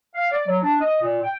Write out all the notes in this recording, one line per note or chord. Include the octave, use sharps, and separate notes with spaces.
F5
D5
F#3
D4
D#5
A#2
G5